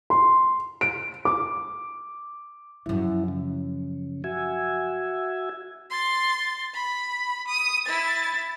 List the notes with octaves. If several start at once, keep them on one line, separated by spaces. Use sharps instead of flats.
C6
D7
D6
F#2 F3 E4
C#3
F#4 E5 G#5
C6 A6
B5
D#6
E4 A6